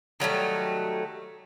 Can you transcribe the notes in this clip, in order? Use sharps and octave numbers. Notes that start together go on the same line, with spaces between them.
D#3 F#3 G3 A3